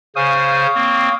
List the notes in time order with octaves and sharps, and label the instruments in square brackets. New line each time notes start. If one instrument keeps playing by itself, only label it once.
[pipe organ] C#3 C5 G#5 [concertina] C#5 F5 D#6
[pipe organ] A#3 C4